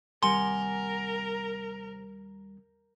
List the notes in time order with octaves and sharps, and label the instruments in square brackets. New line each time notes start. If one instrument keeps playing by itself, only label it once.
[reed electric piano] D#2 G3 [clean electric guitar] C3 F#5 G#5 [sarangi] A#4 [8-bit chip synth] C6